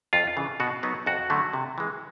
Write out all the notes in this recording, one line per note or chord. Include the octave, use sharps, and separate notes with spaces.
F2 F4
C#3 E3
B2 F#4
F#3 B3 D#4
F2 F#4
D3 F#3 A3
C3
E3 G#3